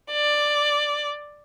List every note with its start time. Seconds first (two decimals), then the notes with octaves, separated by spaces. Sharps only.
0.11 D5